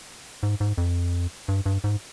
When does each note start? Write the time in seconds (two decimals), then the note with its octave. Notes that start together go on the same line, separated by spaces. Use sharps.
0.43 G#2
0.60 G#2
0.78 F2
1.48 G2
1.66 G2
1.84 G#2